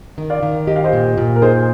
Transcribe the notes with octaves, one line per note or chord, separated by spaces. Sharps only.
D#3
D5 F5
D#3
G4 D#5
F5
C5 D#5
A#2
A#2
A#4
D#4 G#4 C5